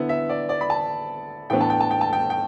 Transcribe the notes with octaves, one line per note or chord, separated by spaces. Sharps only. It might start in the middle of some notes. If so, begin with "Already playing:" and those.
Already playing: D3 B3 E4
E5
D5
D5
B5
A5
A2 E3 B3 D4 G5
A5
G5
A5
G5
A5
G5
G5